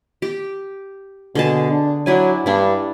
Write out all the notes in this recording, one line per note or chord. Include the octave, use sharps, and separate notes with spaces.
G4
B2 D3 G#4 A5
D4
F#3 D4 E4 G#5
G2 D4 E4